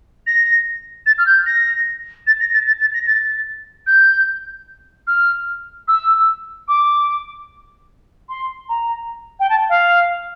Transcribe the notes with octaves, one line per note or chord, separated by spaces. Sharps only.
A#6
A6
F6
G6
A#6
A6
A#6
A6
A6
A6
A#6
A6
G6
F6
E6
D6
C6
A#5
G5
A5
F5